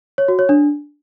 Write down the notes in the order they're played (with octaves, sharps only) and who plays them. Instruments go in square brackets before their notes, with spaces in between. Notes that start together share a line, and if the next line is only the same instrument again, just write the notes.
[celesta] C#5
F#4
C#5
D4